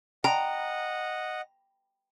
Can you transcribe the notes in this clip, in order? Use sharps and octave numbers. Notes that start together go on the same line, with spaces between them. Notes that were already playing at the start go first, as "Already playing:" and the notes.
D#5 F#5 G5 A#5